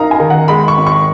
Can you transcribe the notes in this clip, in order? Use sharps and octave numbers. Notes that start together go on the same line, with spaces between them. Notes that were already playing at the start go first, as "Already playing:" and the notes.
Already playing: F#2 D#4 A#4 F5 A#5
G#5
D#3
F#5
G#3 B5
C#6
G#1
C#6